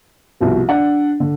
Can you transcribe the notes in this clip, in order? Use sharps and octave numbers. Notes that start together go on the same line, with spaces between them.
C2 B2 F3
D4 F#5
D3